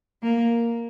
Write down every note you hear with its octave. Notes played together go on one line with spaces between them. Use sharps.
A#3